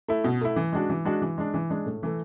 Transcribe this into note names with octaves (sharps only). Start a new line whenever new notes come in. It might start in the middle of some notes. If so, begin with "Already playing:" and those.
A3 E4
B2
A3 E4
E3
G#3 D4 F#4
E3
G#3 D4 F#4
E3
G#3 D4
E3
G#3 D4
A2
E3 A3